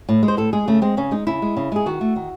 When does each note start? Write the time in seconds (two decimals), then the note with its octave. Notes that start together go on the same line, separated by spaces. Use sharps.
0.09 A2
0.23 G#3
0.28 C5
0.37 A2 A4
0.53 G#3 G#4
0.68 C#3 A3
0.82 G#3 C4
0.97 C#3 C#4
1.11 G#3 D#4
1.27 C#3 E4
1.42 G#3
1.57 C#3
1.72 G#3 G#4
1.86 D#3 F#4
2.01 A3
2.16 D#3